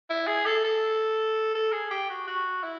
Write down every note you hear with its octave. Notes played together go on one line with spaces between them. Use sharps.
E4
G#4
A4
A4
A4
G#4
G4
F#4
F#4
E4